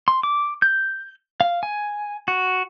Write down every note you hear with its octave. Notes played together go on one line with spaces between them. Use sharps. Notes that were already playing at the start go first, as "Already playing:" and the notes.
C6
D6
G6
F5
G#5
F#4